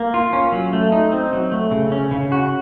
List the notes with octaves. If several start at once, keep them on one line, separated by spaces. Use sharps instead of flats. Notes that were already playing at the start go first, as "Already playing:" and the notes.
Already playing: A#3
F4
C#4
F#3
A3
D#4
C4
F#3
A3
C#3
C#4
C#3
F#4